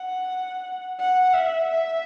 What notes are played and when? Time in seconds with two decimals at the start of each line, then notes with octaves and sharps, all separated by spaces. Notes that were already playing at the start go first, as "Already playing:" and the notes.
Already playing: F#5
1.00 F#5
1.33 E5
1.69 E5